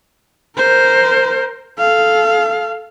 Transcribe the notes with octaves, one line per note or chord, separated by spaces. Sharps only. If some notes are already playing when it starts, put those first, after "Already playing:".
A#4 C5
A4 F5